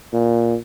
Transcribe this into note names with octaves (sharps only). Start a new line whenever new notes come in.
A#2